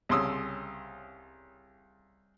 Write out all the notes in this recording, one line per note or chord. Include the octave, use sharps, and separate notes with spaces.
C2 C#3 C#4 C6 D#6 E6